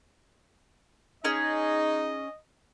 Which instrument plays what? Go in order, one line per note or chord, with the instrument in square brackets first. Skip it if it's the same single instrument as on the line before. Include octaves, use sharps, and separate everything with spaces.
[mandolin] C#4 G#4 [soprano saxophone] D#4 [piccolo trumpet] D#5